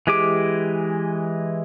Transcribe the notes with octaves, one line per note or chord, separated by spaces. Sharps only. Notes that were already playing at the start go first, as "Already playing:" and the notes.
E3 G#3 G4 G#4 D6